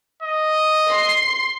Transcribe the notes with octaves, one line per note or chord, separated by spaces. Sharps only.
D#5
C6 C7